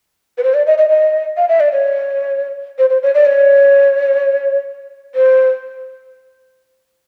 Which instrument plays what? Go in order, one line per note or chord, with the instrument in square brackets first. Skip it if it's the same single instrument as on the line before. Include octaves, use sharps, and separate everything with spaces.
[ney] B4
C5
D5
D#5
D#5
D#5
F5
E5
D5
C#5
C5
C5
C#5
D5
C#5
C5